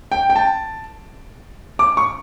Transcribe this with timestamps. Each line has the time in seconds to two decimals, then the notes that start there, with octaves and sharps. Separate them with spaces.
0.12 G5
0.30 G5
0.36 A5
1.79 D6
1.97 C#6